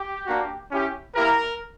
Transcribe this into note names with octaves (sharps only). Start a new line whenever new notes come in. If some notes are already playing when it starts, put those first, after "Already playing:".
Already playing: G4
A#3 D4 F#4
C#4 E4 G4
A#3 E4 G4 A#4